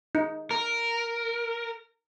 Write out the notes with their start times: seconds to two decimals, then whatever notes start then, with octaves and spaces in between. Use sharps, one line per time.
0.15 D#4
0.51 A#4